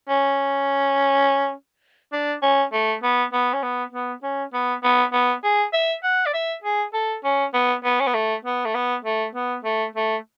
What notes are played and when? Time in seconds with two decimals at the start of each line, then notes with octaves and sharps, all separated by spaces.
0.09 C#4
2.12 D4
2.42 C#4
2.73 A3
3.03 B3
3.33 B3
3.53 C#4
3.63 B3
3.92 B3
4.23 C#4
4.53 B3
4.83 B3
5.13 B3
5.44 G#4
5.73 E5
6.04 F#5
6.26 D5
6.34 E5
6.64 G#4
6.94 A4
7.24 C#4
7.54 B3
7.84 B3
8.00 C#4
8.07 B3
8.14 A3
8.44 B3
8.65 A3
8.74 B3
9.04 A3
9.35 B3
9.64 A3
9.95 A3